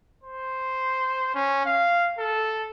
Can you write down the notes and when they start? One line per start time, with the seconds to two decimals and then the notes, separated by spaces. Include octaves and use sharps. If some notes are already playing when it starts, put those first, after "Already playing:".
0.24 C5
1.35 C#4
1.66 F5
2.18 A4